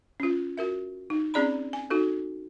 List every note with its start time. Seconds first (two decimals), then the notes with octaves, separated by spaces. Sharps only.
0.20 C#4 F4
0.57 F#4 A#4 E5
1.10 D#4
1.34 C4 C#4 G#4 D5 A#5 B5
1.73 G#5
1.90 D#4 F#4 A4